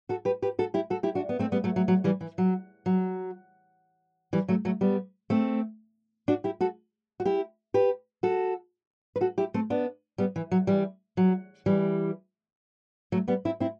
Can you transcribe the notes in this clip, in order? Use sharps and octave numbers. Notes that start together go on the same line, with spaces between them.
F#4 A4
G4 B4
G4 B4
F#4 A4
E4 G4
F#4 A4
E4 G4
D4 F#4
B3
A3 C4
G3 B3
F#3 A3
F#3
F#3
E3 G3
E3
F#3
F#3
E3 G3
F#3 A3
F#3 A3
G3 B3
A3 C4
D4 F#4
E4 G4
F#4 A4
F#4
E4 G4
G4 B4
F#4 A4
B4
F#4 A4
E4 G4
A3 C4
B3 D4
G3 B3
E3
F#3
E3 G3
F#3
E3 G3
F#3 A3
G3 B3
C4 E4
C4 E4